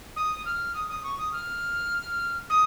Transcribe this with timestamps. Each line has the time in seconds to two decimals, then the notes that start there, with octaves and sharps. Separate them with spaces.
0.16 D#6
0.45 F6
0.74 D#6
0.88 D#6
1.03 C#6
1.18 D#6
1.33 F6
2.50 D#6